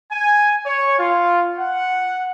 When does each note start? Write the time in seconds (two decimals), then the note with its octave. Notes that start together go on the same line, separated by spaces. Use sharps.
0.12 G#5
0.66 C#5
0.99 F4
1.59 F#5